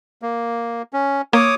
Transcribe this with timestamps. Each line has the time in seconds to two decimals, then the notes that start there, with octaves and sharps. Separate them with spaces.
0.22 A#3
0.93 C#4
1.33 A#3 C#5 D6 D#6